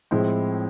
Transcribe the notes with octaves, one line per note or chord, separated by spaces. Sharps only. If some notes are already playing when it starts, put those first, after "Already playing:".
A2 F3 G#3 C4 E4